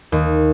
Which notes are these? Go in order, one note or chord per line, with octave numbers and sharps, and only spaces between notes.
D#2